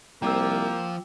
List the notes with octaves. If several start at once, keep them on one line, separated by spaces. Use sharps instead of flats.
C2 F3 A#3 G5 D6 E6